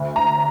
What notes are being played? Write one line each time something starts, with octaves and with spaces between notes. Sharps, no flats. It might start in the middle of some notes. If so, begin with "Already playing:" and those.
Already playing: D2
A#5